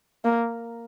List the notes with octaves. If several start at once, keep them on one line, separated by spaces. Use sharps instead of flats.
A#3